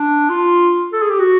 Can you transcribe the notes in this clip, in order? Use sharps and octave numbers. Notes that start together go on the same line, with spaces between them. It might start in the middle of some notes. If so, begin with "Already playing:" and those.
Already playing: D4
F4
A4
G#4
G4
F#4